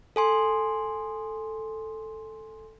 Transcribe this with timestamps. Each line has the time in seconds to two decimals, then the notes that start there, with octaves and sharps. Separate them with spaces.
0.16 A4 G#5 C6